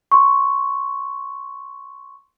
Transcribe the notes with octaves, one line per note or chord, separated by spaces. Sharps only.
C6 C#6